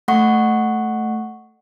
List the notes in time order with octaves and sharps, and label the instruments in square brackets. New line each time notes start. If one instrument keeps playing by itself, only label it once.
[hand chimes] A3 F#5 C#6